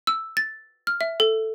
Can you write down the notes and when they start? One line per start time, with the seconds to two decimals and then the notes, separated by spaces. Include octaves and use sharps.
0.07 E6
0.37 A6
0.87 F6
1.01 E5
1.20 A4